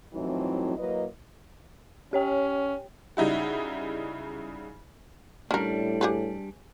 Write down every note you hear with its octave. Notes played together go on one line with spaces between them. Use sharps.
F2 A2 E3 F#3 C4 D#4
F#3 A#3 E4 B4 D#5
C#4 G4 C#5 G5
C#3 G3 D#4 E4 F#4
A2 G3 C#4 D4 A#4
G4 G#4 B4